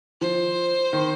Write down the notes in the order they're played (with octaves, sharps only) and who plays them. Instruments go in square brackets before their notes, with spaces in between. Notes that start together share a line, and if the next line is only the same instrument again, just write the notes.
[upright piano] F3 [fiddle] C5
[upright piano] D#3